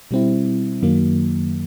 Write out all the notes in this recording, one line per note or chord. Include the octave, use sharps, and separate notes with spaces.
B2 G3 C4 E4
F#2 D#3 F#3 A#3